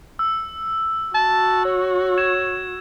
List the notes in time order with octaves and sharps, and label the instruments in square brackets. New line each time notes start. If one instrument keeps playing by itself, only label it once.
[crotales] E6
[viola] F#4 [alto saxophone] A5
[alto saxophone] C#5
[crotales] G#6 E7